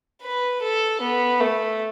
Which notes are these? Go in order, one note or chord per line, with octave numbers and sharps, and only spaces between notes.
B4
A4
B3
A3